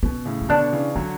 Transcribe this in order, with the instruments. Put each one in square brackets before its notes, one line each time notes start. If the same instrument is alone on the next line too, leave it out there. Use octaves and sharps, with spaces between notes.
[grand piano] B2 [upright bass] C#4
[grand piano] A2 C#3
[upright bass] C#4
[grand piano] B2 D3 [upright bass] D4
[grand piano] C#3 E3
[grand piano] D3 F#3 [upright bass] D4